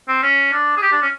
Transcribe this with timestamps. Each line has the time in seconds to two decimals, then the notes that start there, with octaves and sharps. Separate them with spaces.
0.08 C4
0.23 C#4
0.53 D4
0.77 G#4
0.82 G4
0.92 D4
1.02 C#4